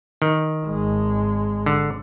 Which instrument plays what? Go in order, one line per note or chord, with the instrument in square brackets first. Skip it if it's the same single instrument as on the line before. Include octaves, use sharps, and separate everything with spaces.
[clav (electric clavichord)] D#3
[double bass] G#1 G#3
[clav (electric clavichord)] D3